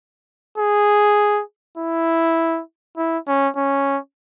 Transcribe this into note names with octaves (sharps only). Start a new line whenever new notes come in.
G#4
E4
E4
C#4
C#4